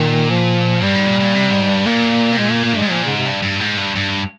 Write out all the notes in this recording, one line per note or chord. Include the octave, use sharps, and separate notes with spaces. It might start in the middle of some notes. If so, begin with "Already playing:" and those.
Already playing: A#2 D#3
F3
G2 G3
G#2
A#2
A#2
C3
G#2
G2
A#2 A#3
C3
A#2 G#3
A#3
A#3
G2
G#2 G#3
A#2 F3
G#2 C#3
C3
G2
G2
G#2
G2
G2